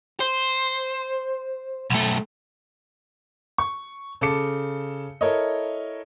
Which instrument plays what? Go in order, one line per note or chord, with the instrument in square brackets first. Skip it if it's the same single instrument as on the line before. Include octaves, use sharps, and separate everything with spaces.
[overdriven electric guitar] C5
B1 A3
[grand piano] C#6
C#3 A4 A5 D6 C#7
E4 A4 A#4 C#5 D#5